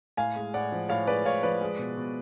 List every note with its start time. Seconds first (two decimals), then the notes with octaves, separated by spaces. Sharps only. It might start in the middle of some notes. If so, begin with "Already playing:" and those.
0.17 A2 F5 G#5
0.36 G#3
0.54 A2 D5 F#5
0.72 F3
0.89 A2 C#5 F5
1.07 G#3 B4 D5
1.25 A2 C#5 F5
1.43 F3 B4 D5
1.61 G#3
1.79 B2
1.97 B2